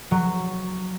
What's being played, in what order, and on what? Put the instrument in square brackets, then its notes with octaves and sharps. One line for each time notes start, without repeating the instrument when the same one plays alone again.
[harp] F#3